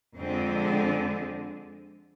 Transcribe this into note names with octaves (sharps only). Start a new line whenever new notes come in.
F2 D3 G#3 C4